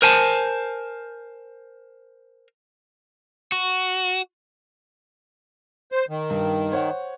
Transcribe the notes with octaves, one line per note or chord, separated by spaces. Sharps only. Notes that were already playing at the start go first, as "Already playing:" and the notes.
A#4 C5 G#5 A5
F#4
C5
D#3
G2
C5 C#5 F#5